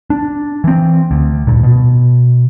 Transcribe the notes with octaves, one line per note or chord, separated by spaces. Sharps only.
D4
E3 C4
D2
D#1 G2 A#2
B2